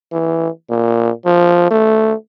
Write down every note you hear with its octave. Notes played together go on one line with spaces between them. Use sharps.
E3
A#2
F3
A3